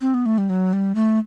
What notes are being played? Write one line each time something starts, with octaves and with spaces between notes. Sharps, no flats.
C4
B3
A3
G3
F#3
G3
A3